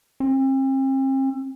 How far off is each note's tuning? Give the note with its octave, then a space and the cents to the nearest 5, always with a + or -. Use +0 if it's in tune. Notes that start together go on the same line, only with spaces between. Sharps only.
C4 +40